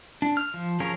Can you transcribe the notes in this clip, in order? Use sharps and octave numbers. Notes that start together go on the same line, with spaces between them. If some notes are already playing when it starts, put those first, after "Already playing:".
D4
F6
F3
F3 C#4 G#4 A#4